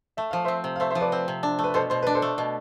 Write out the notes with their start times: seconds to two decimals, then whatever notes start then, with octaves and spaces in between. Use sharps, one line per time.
0.17 A3 E5
0.31 F3 F5
0.45 C4 C5 E5
0.64 C3
0.76 F5
0.80 A3 C5 E5
0.90 C5 E5
0.95 F3
1.01 B4 D5
1.12 C4
1.28 C3
1.43 D4
1.59 A3
1.64 B4
1.74 B2 A4 C5
1.90 B2 C5
2.03 D4 B4
2.15 A4 C5
2.22 A3
2.38 B2